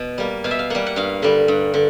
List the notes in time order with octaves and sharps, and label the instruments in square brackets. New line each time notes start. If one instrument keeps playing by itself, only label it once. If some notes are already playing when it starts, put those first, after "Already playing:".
Already playing: [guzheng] B2
G3 A#3
B2 F5
E5
F5
G3 A#3 F#5
F#5
G2 F5
D3 G3
G2
D3